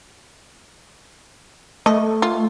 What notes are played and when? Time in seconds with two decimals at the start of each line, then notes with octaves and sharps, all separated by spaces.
1.86 A3 D#5
2.22 F4